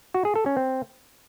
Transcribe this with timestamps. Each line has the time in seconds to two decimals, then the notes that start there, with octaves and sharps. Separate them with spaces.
0.14 F#4
0.25 G#4
0.36 A4
0.46 C#4
0.57 C4